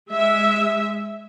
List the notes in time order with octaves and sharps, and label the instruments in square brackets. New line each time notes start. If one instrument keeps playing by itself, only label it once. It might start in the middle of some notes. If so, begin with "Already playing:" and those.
[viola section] G#3 E5